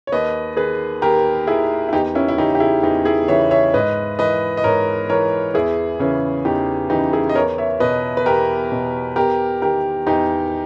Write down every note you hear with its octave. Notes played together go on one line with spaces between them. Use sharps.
C#5
D#2 B4 D#5
D#3 G#4 B4
D#2 G4 A#4
D#3 E4 G#4
E4
E2 D#4 G4
C#4 E4
E4
C#3 E3 D#4 G4
G4
E4 G#4
E2 D#4 G4
E4 G#4
C#3 E3 C#5 E5
C#5 E5
G#2 B4 D#5
E3 B4 D#5
D#5
G#2 A#4 C#5
E3 A#4 C#5
E2 E4 G#4
C#3 E3 C#4 E4
E2 D#4 G4
C#3 E3 D#4 G4
E4 G#4
D#5
E2 A#4 C#5
C#5 E5
B2 B4 D#5
B4
E2 G4 A#4
B2
E2 G4 A#4
D#3 G4 A#4
E2 D#4 G4